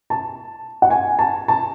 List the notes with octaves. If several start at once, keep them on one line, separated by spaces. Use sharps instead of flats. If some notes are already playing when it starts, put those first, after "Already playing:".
A5
F#5
G#5
A5
A5